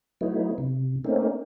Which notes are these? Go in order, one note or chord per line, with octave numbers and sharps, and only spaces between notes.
F#3 A3 B3 D#4 E4
C3
A3 A#3 C4 C#4 D#4